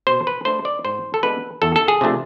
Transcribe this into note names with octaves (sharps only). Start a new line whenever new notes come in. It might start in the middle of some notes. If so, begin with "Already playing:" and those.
B2 C5
B4
A3 D4 C5
D5
G#2 C5
A4
G#3 B3 D4 B4
E2 A4
A4
G#4
C3 F3 A3 D4